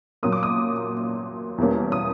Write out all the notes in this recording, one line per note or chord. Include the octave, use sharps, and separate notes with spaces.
A#2 F#3 A#3 D#6
D6
D#6
E2 B2 G3 A#3 C#4
D#6